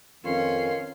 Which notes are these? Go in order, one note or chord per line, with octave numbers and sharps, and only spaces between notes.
F2 D#3 C#4 B4 F5 C6